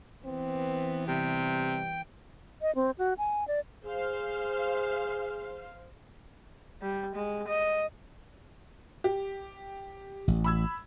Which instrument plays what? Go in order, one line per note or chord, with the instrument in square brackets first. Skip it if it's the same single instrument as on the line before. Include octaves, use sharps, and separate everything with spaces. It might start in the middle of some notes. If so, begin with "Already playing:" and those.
[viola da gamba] E3 B3 [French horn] C4
[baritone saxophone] C3 [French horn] G3 [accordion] G5
[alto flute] D#5
C4
F#4
G#5
D5
[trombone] G#4 [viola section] C5 F5
[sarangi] G3
G#3
D#5
[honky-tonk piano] G4
[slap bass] A1
[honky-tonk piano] B5 E6 G#6